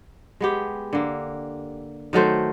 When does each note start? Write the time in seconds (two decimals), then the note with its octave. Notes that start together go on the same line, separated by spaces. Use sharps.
0.40 G#3 B3 G4
0.93 D3 A#3
2.13 D#3 F#3 A3 C5